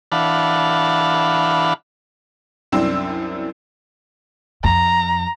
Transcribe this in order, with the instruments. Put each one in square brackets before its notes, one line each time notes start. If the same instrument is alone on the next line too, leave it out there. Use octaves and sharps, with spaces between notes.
[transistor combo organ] E3 D4 F5 F#5 A5 B5
[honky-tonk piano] C2 F#2 C4 D4 E4 E6
[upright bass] F2 [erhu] A#5